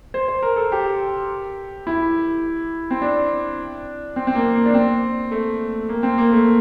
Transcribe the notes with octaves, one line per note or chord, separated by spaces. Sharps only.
C5
C5
A#4
A4
G4
E4
C4
D4
C4
C4
A#3
A#3
D4
C4
A3
A#3
C4
A#3
A3